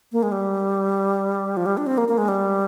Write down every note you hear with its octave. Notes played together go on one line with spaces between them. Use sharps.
A#3
G#3
G3
F3
G3
D4
C4
A#3
A#3
G#3
G3